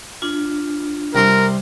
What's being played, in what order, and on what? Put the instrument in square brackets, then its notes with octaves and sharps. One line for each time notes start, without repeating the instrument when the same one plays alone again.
[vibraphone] D4 F4
[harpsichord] C2 C6 [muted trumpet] A#4